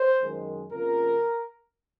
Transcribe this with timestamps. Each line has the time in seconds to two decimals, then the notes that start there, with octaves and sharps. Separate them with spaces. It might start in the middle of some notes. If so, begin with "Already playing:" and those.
Already playing: C5
0.20 F#2 D#3 G#3
0.71 F2 C#3 F3 A#3 A#4